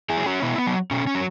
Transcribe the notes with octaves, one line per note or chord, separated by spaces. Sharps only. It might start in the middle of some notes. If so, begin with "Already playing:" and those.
E4 G#4
F#3
C#4 F#4
B2 B3 E4
B3
F#3
B2 C#4
C#4
F#3